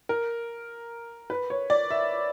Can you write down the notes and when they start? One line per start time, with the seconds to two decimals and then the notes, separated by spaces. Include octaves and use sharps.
0.09 A#4
1.30 B4
1.50 C#5
1.70 D5
1.91 E5